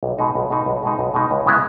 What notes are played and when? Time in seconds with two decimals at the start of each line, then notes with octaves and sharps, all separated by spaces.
0.03 B1
0.19 B2 G#3 D#4
0.35 B1
0.50 B2 G#3 D#4
0.66 B1
0.83 B2 G#3 D#4
0.99 B1
1.14 B2 G#3 D#4
1.31 C#2
1.46 C#3 G#3 B3 E4